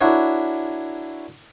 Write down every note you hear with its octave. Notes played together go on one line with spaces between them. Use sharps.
D4 E4 F#4 A#4 C#5